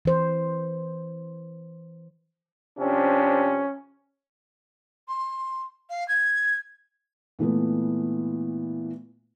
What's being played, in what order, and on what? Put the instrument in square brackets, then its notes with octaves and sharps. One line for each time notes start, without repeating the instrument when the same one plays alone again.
[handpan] E3 C5
[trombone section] C3 F3 D4 [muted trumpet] C#4
[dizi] C6
F5
G#6
[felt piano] A#2 E3 A3 B3